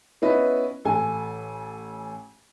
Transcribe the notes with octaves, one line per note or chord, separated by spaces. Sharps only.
B3 C#4 E4 B4 D#5 E5
A1 A4 G#5